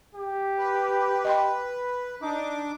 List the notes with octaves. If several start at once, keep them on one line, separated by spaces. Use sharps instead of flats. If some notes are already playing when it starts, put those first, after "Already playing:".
G4
B4
D#5 G5 C6
D4 D#4 D6